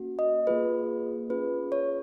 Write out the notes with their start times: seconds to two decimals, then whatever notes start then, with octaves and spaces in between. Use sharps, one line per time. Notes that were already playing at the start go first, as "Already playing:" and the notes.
Already playing: A#3 C#4 F#4
0.19 D#5
0.47 A#3 F4 G#4 B4
1.30 C#4 F4 G#4 B4
1.72 C#5